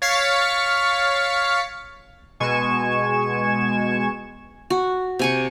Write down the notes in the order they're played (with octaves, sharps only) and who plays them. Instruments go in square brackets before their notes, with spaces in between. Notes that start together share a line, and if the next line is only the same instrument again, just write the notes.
[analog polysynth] C#5 F5 A6 B6 C#7
B2 G#3 G#5 C#6 G#6 E7
[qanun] F#4
C3 G#5 C#6